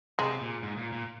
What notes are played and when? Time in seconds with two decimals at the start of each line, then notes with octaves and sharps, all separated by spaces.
0.19 C3 G#3
0.41 A#2
0.63 G#2
0.78 A#2
0.92 A#2